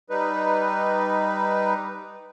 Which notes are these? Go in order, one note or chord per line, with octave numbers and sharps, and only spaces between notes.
G3 D#4 B4